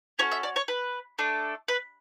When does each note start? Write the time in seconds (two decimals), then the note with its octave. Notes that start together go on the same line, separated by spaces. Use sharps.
0.19 C#4 F#4 A4 C#5
0.32 E5
0.43 D5
0.56 C#5
0.68 B4
1.19 A3 D4 A4
1.68 B4